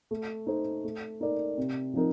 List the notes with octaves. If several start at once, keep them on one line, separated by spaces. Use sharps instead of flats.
A3
D#4 A4 C5
A3
D#4 A#4 D5
C3
F3 C4 D#4 A#4